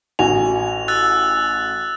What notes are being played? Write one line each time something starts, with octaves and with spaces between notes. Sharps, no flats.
A1 F#4 G#5 F7
E6 F#6 A6